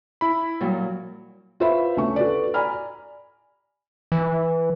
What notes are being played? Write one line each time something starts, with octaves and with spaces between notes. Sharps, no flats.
E4 B5
A#2 F#3 G3
F4 F#4 B4 C5 E5 B5
D2 A3 C#4 C#6
F#4 A4 B4 D5
D5 G#5 A#5 B5 F6
E3